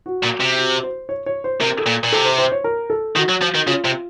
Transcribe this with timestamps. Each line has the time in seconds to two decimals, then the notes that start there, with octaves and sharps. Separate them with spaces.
0.06 F#4
0.23 A#2
0.40 C3
0.58 F#4
0.83 C5
1.09 C#5
1.26 C#5
1.44 C5
1.60 C3 A#4
1.78 A4
1.86 A#2
2.03 A#2
2.12 C3 A4
2.25 C5
2.38 C5
2.52 C#5
2.64 A#4
2.90 A4
3.16 D#3 F#4
3.29 F#3
3.42 F3
3.55 D#3
3.67 C#3 F4
3.85 C3